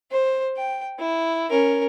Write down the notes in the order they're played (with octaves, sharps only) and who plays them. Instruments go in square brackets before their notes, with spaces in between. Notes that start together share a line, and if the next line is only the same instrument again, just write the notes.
[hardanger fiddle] C5
G5
E4
C#4 A#4